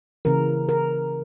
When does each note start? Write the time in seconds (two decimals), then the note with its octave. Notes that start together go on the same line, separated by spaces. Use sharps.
0.25 C#3 E3 A#3 A#4
0.69 A#4